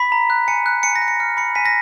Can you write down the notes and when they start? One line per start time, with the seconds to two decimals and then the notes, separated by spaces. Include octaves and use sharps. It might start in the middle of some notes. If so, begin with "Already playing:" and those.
Already playing: B5 B6
0.12 A#5
0.30 F#6
0.48 G#5 C#7
0.66 F#6
0.83 G#5 C#7
0.96 A#6
1.02 F#6
1.08 C#7
1.20 F6 C#7
1.37 B5 C#7
1.55 G#5 B6
1.65 A#6